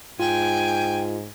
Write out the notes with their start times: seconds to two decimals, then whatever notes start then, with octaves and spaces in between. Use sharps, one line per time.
0.19 G#2 F4 G5 G#5